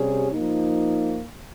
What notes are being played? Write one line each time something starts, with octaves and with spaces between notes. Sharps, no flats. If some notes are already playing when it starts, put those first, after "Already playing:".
Already playing: C3 G3 C#4 G#4
F3 A#3 D#4